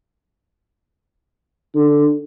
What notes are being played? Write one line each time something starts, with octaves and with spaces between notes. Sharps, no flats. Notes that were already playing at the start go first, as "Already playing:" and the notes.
D3